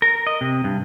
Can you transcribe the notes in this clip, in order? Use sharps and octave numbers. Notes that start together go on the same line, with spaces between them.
A#4
D#5
C3
G2